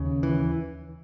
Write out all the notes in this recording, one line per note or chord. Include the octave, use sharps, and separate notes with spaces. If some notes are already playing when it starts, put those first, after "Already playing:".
Already playing: D#2 C#3
E3